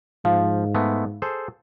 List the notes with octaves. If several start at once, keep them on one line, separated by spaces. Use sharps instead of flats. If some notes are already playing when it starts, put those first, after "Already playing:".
G#2 F3 F5
G#3 A3 B3
G#4 A4 C5